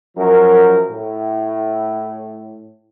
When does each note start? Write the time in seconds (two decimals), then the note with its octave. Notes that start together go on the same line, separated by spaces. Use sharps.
0.17 F#2 F3 A#4
0.90 A2